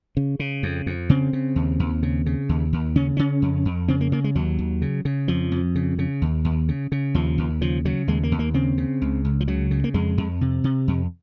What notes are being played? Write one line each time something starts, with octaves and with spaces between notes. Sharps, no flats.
C#3
C#3
F2
F2
C#3 C4
C#3
D#2
D#2
C#3
C#3
D#2
D#2
C#3 C#4
C#3 C#4
F2
F2
C#3 C4
A#3
C#3 A#3
G#3
D#2 F#3
D#2
C#3
C#3
F2 F3
F2
C#3
C#3
D#2
D#2
C#3
C#3
D#2 F3
D#2
C#3 F3
C#3 F#3
D#2 G#3
A#3
D#2
A#3
C#3 C4
C#3
C#2
C#2
F3
C#3 F#3
C#3
A#3
F2 G#3
F2
C3
C3
F2